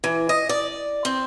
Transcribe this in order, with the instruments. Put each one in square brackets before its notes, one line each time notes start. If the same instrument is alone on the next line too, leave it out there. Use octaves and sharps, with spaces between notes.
[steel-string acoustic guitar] E3
D#5
D5
C4